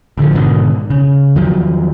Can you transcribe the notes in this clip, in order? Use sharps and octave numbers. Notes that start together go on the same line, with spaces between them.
A1 D3 E3 F3
G#2 B2 D3 D#3
C#3
E2 D#3 F3 F#3